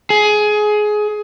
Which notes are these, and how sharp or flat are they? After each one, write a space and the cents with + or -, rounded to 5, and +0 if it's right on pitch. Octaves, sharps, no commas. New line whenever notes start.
G#4 +20